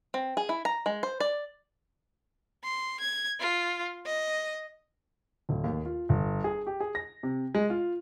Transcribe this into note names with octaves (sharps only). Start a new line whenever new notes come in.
C4
G#4
E4
A#5
G#3
C5
D5
C6
G#6
F4
D#5
D1
D#2
F4
G1
G#4
G4
G#4
A#6
C3
G#3
F4